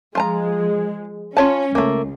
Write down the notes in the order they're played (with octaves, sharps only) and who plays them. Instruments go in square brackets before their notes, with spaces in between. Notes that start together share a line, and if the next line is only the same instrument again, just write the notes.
[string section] F3 G#3 [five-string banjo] F4 A5 A#5
[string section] C#4 [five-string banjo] F4 C#5 A5
[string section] C#2 [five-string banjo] A3 A#3